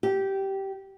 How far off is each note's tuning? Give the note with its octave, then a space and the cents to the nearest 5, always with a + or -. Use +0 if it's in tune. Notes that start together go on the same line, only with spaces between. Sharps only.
G4 -15